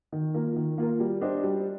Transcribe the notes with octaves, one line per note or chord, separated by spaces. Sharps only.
D#3
A#3 F4 A#4
D#3
A#3 F4 A#4
G3
D4 G4 C5 D#5
G3